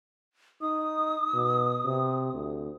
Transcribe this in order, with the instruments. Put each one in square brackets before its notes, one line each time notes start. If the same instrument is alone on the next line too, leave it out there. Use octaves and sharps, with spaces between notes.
[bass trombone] D#4 [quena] D#6
[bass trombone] B2
C3
D2